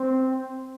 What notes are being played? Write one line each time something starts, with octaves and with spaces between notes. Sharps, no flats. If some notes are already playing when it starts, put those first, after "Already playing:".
Already playing: C4